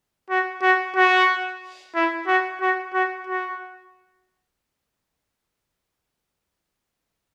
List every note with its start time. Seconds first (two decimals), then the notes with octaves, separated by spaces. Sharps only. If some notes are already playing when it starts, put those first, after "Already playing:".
0.30 F#4
0.62 F#4
0.96 F#4
1.95 E4
2.27 F#4
2.61 F#4
2.94 F#4
3.27 F#4